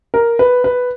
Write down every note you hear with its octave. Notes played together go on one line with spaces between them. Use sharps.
A#4
B4
B4